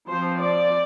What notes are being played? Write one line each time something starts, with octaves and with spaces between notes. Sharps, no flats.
F3 C4 C5
D5